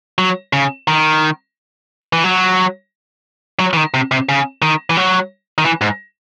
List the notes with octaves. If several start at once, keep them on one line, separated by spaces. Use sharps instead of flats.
F#3
C#3
D#3
E3
F#3
F#3
E3
D#3
C3
C3
C#3
D#3
E3
F#3
D#3
E3
G#2